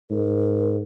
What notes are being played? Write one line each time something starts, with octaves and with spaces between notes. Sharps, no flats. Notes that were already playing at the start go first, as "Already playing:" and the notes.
G#2 A#4